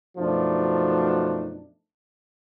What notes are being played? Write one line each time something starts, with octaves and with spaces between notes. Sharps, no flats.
F#2 B2 F3 A3 D4 D#4